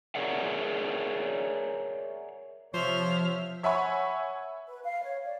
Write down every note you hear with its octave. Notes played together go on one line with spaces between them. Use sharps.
G#4 A#4 C#5 D5 E5 F#5
C3 F3 C5 C#5 E5 F6
C#5 E5 F#5 G#5 B5 C#6
B4
F5
C#5
D5